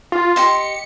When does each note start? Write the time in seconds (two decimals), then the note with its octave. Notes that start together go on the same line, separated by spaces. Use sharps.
0.12 F4
0.36 G4 D#5 C6 C#7